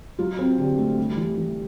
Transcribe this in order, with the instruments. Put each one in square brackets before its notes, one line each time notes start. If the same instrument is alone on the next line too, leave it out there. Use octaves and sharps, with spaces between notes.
[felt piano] F#3 F4
C4
D3 G4
A3
G3
E3
E3